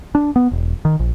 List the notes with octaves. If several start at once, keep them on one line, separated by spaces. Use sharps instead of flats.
D4
B3
E1
D#3
A#1